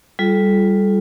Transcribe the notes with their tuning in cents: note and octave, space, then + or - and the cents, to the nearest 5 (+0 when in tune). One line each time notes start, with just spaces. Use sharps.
G3 +0 F4 +0 A4 -30